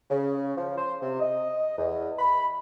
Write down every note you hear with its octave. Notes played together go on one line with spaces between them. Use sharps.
C#3
F3
C5
C3
D#5
E2
B5